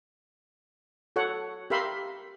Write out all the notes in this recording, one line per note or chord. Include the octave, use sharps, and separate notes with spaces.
F#4 A4 C#5 F#5
G4 A#4 E5 F5 B5 C6